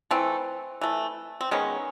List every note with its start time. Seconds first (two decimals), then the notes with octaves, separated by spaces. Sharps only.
0.11 E3 A3 C4
0.81 E3 A3
1.41 C4
1.51 D#3 G#3 B3 C#4